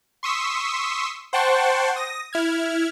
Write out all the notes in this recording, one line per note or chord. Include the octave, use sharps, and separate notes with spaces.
C6 C#6 D#6 E6 B6
C5 F#5 G5 A5 C6 C#6
D#6 A#6
E4 F6 G#6